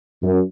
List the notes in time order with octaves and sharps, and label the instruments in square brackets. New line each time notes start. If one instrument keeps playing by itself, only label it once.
[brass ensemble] F#2